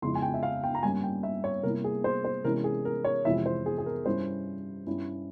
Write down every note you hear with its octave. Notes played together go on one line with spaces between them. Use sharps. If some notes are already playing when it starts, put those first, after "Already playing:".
F2 C#3 F3 G#3 E4 C6
G#5
G5
E5
F5
G5
A#5
G2 G3 A#3 C#4 G#5
G5
E5
C#5
C3 G3 A#3 E4 A#4
G#4
C5
C5
C3 E3 G#3 C#4 E4 A#4
G#4
A#4
C#5
F2 C3 E3 G#3 E4 E5
C5
G#4
G#4
A#4
G2 G3 C#4 E4 C5
G2 G3 C#4 E4